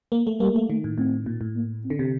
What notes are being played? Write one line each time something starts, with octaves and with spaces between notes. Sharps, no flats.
A#3
A3
G3 A#3
A3
D#3 A3
A2
A2 C4
A#2
A2
A#3
C4
D3
C3